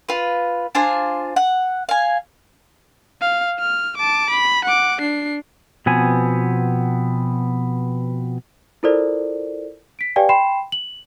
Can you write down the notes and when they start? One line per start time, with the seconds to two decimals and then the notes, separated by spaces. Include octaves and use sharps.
0.09 F4 B4
0.75 D4 F4 C5 G#5
1.36 F#5
1.89 F5 G#5
3.21 F5
3.59 F6
3.97 A5 D6
4.30 B5
4.65 F#5 D6
5.01 D4 C7
5.86 B2 F3 B3 C4 G#5
8.83 E4 F4 A4 A#4 C5 D5
9.99 B6 D7
10.16 G4 B4 D5 F5 G5 G#5
10.29 G5 B5 C6 C7 E7
10.72 F#7